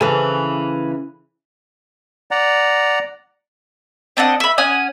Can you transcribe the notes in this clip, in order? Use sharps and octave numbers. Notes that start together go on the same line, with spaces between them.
C#3 E3 A4 B4 G#5 B5
D5 F#5 A#5
C4 D4 D#5 F#5
E5 B5
C#4 F#5 G#5 D#6